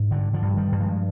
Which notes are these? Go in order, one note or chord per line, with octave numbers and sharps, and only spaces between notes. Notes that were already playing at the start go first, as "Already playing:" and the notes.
Already playing: G#2
G2 D3
D3 F3
G2
D#3 G3
G2
F3 G#3